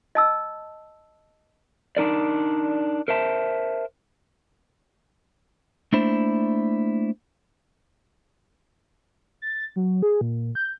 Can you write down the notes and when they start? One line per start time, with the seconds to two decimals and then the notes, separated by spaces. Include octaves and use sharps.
0.15 D#5 A5 E6
1.97 D4 D#4 A#4 D5
3.08 A#4 C5 E5 A5
5.93 A3 A#3 D4 E4 C5
9.42 A6
9.76 F#3
10.02 G#4
10.21 A#2
10.55 G6